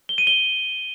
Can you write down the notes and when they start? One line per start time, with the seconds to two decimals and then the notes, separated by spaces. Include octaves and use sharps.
0.09 G7
0.18 D#7
0.27 G7